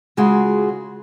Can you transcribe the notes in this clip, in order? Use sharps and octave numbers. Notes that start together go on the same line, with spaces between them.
C#3 G#3 F4 F#4 G#4